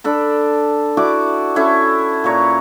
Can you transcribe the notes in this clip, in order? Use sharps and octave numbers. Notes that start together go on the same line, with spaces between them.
D4 A4 B5
E4 F#4 D5 D6
C#4 E4 A4
A#2 B4 C#5 A#5